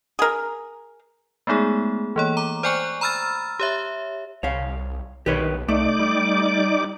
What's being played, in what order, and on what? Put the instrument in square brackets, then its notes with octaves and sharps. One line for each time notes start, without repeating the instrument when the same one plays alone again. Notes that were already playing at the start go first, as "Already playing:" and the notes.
[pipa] G#4 A#4
[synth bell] G#3 A3 B3 D#4 G#4
E3 A#3 C#5
A#5 D6
C5 D5 G5 G#5 C#6 F#6
A#5 B5 E6 F6 A6
G4 C#5 E5
[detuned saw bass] C2 [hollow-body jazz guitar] C#5 F5
[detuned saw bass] B1 [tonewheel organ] D#3 [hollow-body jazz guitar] G4 B4 C#5
[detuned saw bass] C2 [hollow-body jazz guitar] A3 [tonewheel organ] D#4 D5 D6
[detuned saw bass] G3